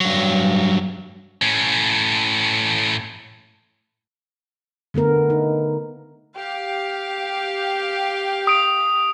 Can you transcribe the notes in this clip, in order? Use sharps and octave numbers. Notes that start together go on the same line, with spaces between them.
G2 F#3
A2 C#4
D3 A3 B3 A#4
D#4
G4 F5
D#6 D7